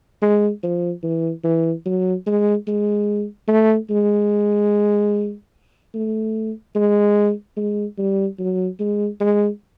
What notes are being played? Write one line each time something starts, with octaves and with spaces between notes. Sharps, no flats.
G#3
F3
E3
E3
F#3
G#3
G#3
A3
G#3
A3
G#3
G#3
G3
F#3
G#3
G#3